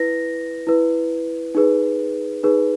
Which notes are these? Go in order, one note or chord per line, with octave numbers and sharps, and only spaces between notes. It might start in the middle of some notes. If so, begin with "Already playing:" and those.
Already playing: E4 B4 A#6
E4 B4
D#4 G#4 B4
D#4 G#4 B4